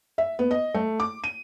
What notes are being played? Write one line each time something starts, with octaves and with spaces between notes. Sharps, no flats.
E5
B3
D#5
A3
D6
D#7